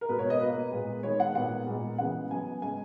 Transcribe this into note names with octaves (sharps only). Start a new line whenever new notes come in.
A#4
B2 G#3 B3 B4
C#5
D#5
B2 A#3 B4
A#2 G#3 B3
D#3 G#3 B3 C#5
F#5
A#2 G#3 B3 F#5
A#2 G#3 B3
C#3 E3 G#3 B3 F#5
C#3 F#3 B3 G#5
C#3 G#3 B3 G#5